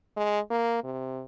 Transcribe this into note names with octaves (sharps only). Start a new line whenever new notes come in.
G#3
A#3
C3